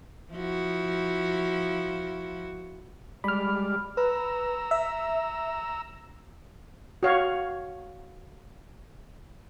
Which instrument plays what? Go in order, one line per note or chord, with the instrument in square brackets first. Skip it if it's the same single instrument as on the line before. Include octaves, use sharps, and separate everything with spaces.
[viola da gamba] F3 E4 F#4
[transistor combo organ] G3 G#3 D5 [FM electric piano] B5 F6
[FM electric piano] B4 [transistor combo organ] A#5 E6
[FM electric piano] E5
[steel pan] F#4 C#5 F5